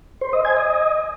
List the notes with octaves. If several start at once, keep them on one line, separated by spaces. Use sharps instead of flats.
C5
D#5
G#5
D#5